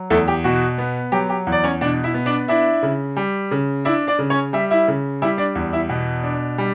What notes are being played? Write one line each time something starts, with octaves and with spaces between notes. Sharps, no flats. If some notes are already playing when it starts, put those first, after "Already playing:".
Already playing: F#3
E2 A3 A4
G4
B2 F#4
B3
F#3 G4
G4
E2
D5
C#4 C#5
B2 D4 D5
E4 E5
B3
D4 D5
D4 E4 E5
C#3
G3
C#3
D4 E4 E5
D4 D5
C#3
C#4 C#5
G3 E5
E4 E5
C#3
G3 E4 E5
D4 D5
E2
E4 E5
B2
D4
G3